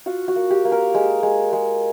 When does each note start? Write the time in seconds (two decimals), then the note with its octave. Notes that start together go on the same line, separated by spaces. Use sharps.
0.06 F4 F#4
0.28 F#4
0.36 A#3
0.51 G4
0.65 A#3
0.72 A#4
0.95 G#3
1.23 G#3
1.53 G#3